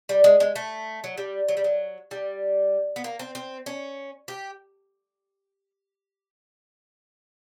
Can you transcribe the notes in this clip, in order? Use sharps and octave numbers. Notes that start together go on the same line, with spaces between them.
G3
G#3
G#3
A3
F#3
G3
F#3
G3
F#3
G3
B3
A#3
C4
C4
C#4
G4